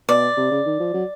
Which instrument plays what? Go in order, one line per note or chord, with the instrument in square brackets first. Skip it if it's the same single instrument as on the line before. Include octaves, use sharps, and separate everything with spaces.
[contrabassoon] B2 [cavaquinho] D5
[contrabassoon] C3
C#3
D#3
F3
F#3